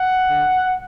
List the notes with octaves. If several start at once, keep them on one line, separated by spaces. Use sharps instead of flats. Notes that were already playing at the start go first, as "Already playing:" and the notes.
Already playing: F#5
D3